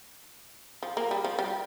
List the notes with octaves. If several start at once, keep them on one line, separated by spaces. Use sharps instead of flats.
F3
A#3
G3
F3
G3